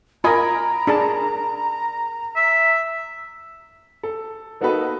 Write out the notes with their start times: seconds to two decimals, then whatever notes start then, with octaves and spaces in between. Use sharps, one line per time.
0.24 F4 A#4 D#5 G#5 A#5 B5
0.87 D4 G#4 A5
2.36 E5
4.03 A4
4.61 A#3 B3 D#4 F#4 A4 B4